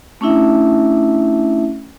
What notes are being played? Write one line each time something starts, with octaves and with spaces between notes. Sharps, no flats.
A3 C#4 D4 E4 E5